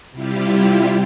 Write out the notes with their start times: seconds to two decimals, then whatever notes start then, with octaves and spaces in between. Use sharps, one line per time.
0.12 C3 G3 E4 F4 G4